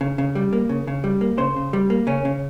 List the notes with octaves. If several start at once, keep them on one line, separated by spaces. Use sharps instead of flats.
C#3
C#3
G3
A#3
C#3
C#3
G3
A#3
C#3 C5
C#3
G3
A#3
C#3 C#4
C#3